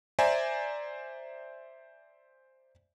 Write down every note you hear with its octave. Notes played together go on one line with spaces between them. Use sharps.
C5 D5 E5 G#5 A#5